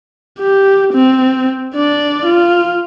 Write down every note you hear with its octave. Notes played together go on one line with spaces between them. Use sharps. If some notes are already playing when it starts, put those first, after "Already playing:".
G4
C4
D4 D5
F4